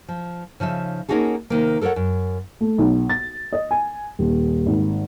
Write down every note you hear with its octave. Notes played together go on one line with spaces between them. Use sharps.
F3
C#3 F3 D#4 E5
A#3 C#4 D#4 F#4 G#4 A4
C3 D#3 A#3
A4 A#4 C5 C#5 F#5
F#2
A3
B1
A6
D#5
G#5
D#1
G#1